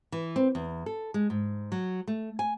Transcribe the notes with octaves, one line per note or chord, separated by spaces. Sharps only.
E3
C4
E2
A4
G#3
G#2
F#3
A3
G#5